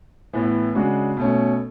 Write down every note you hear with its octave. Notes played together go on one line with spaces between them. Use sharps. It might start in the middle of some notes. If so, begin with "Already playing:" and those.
A2 E3 B3
C#3 G#3 D4 F#4
B2 A3 C#4